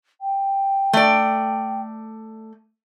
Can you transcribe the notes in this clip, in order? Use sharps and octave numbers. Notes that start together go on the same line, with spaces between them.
G5
A3 D5